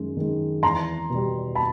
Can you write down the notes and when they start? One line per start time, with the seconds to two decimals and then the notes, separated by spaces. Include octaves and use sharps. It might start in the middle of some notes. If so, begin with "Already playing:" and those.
Already playing: F#2 D#3 G#3
0.17 D#3 G#3
0.62 E2 A#5 C6
1.10 B2 G3
1.55 A5 B5